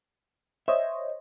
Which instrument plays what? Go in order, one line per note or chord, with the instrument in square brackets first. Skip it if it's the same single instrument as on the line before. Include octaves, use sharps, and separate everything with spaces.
[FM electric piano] C5 C#5 D#5 [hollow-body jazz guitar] E5